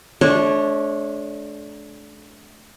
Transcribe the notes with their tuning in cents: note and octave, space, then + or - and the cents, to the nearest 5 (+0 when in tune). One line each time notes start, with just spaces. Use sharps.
A3 -40 D4 -10 C#5 -15